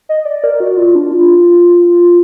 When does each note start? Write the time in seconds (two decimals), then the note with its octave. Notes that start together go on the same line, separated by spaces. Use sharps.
0.09 D#5
0.25 D5
0.44 A#4
0.60 F#4
0.77 F4
0.95 D4
1.11 F4